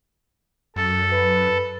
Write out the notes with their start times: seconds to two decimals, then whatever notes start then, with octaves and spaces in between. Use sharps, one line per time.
0.76 F#2 A4
1.12 B4